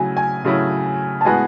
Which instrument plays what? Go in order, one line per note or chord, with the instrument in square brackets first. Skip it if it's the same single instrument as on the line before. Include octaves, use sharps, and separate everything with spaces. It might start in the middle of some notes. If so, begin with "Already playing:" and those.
Already playing: [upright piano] C#3 F#3 A3 E4 [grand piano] G#5
[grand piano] G#5
[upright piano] C#3 F#3 A3 C#4 E4
[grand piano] A5
[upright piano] A2 G#3 B3 F#4 [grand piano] G#5